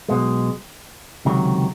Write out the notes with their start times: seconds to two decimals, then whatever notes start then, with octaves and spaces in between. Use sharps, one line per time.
0.09 B1 B2 G#3
1.25 C#2 C3 D#3 F#3